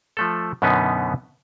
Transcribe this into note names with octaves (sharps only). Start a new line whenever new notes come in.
F3 A3 A4
F#2 B2 D3 B3 C#4 D#4